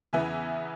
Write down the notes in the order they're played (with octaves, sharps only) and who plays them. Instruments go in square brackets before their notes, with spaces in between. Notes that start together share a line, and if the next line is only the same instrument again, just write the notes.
[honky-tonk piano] E2 C#3 E3 B3 E4 E5 G#5